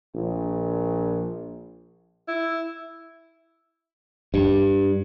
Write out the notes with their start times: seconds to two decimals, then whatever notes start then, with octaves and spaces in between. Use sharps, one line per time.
0.15 A#1
2.28 E4
4.34 G2